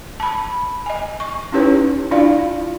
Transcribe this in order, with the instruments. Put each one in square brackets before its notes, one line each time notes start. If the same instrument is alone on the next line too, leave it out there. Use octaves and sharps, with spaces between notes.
[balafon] A5 B5
D#5 G#5
C#6
C#4 D#4 E4 G4 B4 C#5
D4 E4 F4 D5 F5